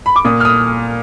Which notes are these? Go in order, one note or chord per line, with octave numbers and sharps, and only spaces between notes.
B5
D6
A#2 D#6
F6
D#6